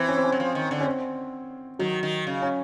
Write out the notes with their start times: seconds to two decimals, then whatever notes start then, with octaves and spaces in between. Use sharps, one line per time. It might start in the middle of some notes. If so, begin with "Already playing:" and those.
Already playing: E3 C4
0.08 C#4
0.17 C4
0.24 C#4
0.32 F#3
0.40 F3
0.55 D#3
0.71 D3
0.81 C#4
0.86 C4
1.79 D#3 F#3
2.03 D#3
2.27 C#3
2.42 C#4